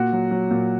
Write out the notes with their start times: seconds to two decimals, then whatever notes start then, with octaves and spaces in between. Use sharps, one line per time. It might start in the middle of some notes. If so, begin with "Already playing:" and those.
Already playing: A#2 F#4
0.13 F#3
0.31 F#3
0.51 A#2